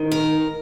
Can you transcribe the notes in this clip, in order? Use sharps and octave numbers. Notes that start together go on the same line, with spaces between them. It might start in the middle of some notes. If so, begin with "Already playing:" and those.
Already playing: G#2 D#3
A#4